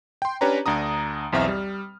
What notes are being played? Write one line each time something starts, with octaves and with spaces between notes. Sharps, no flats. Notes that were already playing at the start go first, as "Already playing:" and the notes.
G5 C6
C#4 D4 G4 B4 C#5 A#5
D2 D4 A#5 D#6
B1 E2 C4 E5 A#5 F6
G3